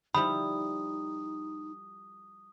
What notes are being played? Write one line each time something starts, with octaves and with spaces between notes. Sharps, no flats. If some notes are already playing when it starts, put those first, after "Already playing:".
F3 G3 D#4 E4 B5 D#6